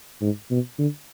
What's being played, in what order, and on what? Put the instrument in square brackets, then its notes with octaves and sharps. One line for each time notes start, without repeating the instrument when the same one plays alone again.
[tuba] G#2
B2
D3